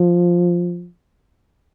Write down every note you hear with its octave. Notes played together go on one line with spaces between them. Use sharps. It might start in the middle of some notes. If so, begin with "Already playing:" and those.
Already playing: F3